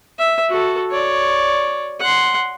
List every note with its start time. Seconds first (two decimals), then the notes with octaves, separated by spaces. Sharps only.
0.19 E5
0.49 F#4 A4
0.91 C#5 D5
2.00 F#5 C6